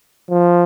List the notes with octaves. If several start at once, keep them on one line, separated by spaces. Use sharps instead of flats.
F3